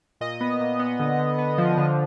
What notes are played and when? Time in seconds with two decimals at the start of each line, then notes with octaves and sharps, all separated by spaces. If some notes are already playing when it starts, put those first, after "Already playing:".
0.21 A#2 D#5
0.41 B3
0.60 A#2
0.79 B3
0.99 D3
1.19 D3
1.38 B3
1.58 F3
1.78 D3